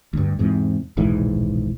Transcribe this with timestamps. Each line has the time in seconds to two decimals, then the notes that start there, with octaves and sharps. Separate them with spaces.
0.13 D2 G2
0.39 E2 G#2 C3
0.97 D#1 B1 G#2 E3